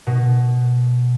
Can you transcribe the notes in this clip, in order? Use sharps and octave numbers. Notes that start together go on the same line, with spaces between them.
B2